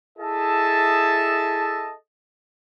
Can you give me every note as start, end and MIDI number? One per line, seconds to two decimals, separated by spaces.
0.19 1.93 64
0.19 1.93 68
0.19 1.93 69
0.19 1.93 75
0.19 1.93 76
0.19 1.93 81